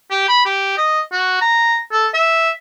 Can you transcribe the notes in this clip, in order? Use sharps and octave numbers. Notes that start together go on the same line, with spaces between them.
G4
B5
G4
D#5
F#4
A#5
A4
E5